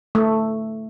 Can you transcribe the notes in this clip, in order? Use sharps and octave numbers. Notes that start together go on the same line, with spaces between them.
A3